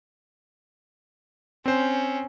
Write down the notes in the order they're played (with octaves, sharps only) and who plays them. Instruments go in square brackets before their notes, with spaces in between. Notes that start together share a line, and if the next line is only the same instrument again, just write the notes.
[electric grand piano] C4 C5 [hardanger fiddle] C#4